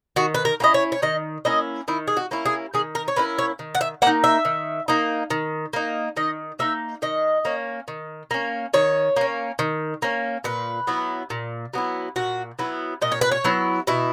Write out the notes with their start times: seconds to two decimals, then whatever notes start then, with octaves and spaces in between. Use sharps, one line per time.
0.16 D#3 F#4
0.34 B4
0.45 A#4
0.60 A#3 C#4 E4 D#5
0.74 C#5
0.92 C#5
1.02 D#3 D#5
1.45 A#3 C#4 E4 D#5
1.88 D#3 E4
2.07 G#4
2.17 F#4
2.31 A#3 C#4 E4
2.46 G#4
2.74 D#3 G#4
2.95 A#4
3.08 C#5
3.16 A#3 C#4 E4 B4
3.38 C#5
3.59 D#3
3.75 F#5
3.81 E5
4.02 A#3 D#4 F#5
4.24 E5
4.45 D#3
4.88 A#3 D#4
5.30 D#3
5.73 A#3 D#4
6.16 D#3 D#5
6.59 A#3 D#4 E5
7.02 D#3 D#5
7.45 A#3 C#4
7.88 D#3
8.31 A#3 C#4
8.74 D#3 C#5
9.16 A#3 C#4
9.59 D#3
10.02 A#3 C#4
10.44 A#2 B4
10.87 F#3 B3 E4
11.30 A#2
11.73 F#3 B3 E4
12.16 A#2 F#4
12.59 F#3 B3 E4
13.02 A#2 D#5
13.12 C#5
13.21 B4
13.31 C#5
13.44 F#3 B3 E4
13.87 B2 E4